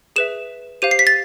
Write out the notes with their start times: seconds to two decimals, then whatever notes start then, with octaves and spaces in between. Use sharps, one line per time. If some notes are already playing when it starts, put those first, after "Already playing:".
0.16 G#4 B4 E5 E7
0.82 G4 C5 F5 D#7
0.91 C7
0.99 B6
1.07 A6